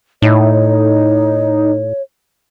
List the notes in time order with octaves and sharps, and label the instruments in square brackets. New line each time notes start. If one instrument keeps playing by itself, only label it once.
[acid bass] A2 [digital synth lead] D#4 [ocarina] C#5